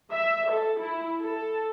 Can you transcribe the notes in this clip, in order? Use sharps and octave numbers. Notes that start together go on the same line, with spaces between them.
E5
A4
E4
A4